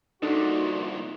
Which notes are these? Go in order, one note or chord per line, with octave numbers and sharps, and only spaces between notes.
C2 A#2 D4 D#4 F#4 A4